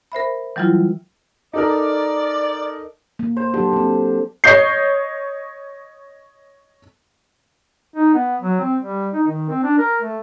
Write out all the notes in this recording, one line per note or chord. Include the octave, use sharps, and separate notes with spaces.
A#4 C5 E5 B5
E3 F#3 G3 E4 F4
D#4 A4 A#4 D5
A#3
C5
D3 F#3 G4
A#3 C4
C#5 D#5 G6 C7
D#4
B3
F#3
C4
G3
D#4
D#3
C4
D4
A#4
A3